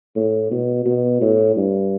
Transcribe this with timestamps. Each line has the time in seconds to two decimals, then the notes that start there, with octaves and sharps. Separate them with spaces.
0.16 A2
0.51 B2
0.86 B2
1.21 A2
1.56 G2